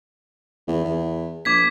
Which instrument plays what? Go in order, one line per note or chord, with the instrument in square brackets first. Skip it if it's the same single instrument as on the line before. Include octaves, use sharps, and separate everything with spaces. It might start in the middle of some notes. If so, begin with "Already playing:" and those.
[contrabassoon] E2
E2
[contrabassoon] A#1 [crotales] D6 G#6 B6